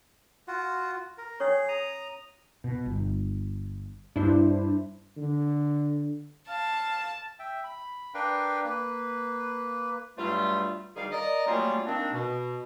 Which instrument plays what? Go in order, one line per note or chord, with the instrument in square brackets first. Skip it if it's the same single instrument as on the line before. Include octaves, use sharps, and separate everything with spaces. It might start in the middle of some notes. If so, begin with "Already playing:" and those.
[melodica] F4 F#4
A#4
[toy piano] C#4 C#5 C#6 [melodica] G#4
[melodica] A#5 D#6
[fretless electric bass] B2
G1
[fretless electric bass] G2 [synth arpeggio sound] D4 E4 C5
[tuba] D3
[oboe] F5 [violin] A5
[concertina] E5 G5
B5
D4 A#4 B4 F5 G5
A#3 B4
[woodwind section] G2 F#3 G3 A3 F4
D2 D#3 G3 G#4 D5 F5
A#4 D5 D#5
F#3 G3 A3 A#3 C#4 F4
D#3 A#3 C4 D4
B2